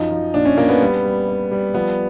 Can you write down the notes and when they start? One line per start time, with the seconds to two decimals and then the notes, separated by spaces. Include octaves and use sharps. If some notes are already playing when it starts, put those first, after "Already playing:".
Already playing: F#2 F3 D#4
0.10 F3
0.34 A#2 D4
0.45 C#4
0.57 A#2 A#3
0.69 B3
0.81 G3
1.04 G3
1.28 G3
1.51 G3
1.74 F3 B3